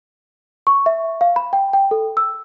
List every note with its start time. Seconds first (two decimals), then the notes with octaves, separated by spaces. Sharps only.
0.67 C#6
0.86 E5
1.21 F5
1.36 B5
1.53 G5
1.73 G5
1.91 A4
2.17 E6